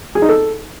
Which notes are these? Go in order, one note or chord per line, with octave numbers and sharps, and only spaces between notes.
G#4
D#4
A4